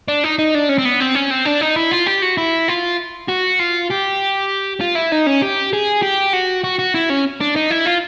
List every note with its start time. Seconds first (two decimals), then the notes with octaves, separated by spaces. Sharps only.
0.08 D4
0.24 D#4
0.39 D#4
0.55 D4
0.69 C#4
0.78 C4
0.85 B3
1.00 C4
1.15 C#4
1.31 C4
1.46 D4
1.61 D#4
1.76 E4
1.91 F4
2.06 G4
2.22 F#4
2.37 E4
2.68 F4
3.28 F#4
3.59 F4
3.90 G4
4.81 F4
4.96 E4
5.12 D#4
5.27 C#4
5.42 G4
5.73 G#4
6.02 G4
6.33 F#4
6.64 F#4
6.79 F#4
6.94 E4
7.10 C#4
7.41 D4
7.56 D#4
7.71 E4
7.86 F4